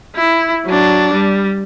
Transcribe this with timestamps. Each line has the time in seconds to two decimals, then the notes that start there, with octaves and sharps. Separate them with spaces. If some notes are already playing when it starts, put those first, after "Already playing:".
0.16 E4
0.66 F#3 D4
1.13 G3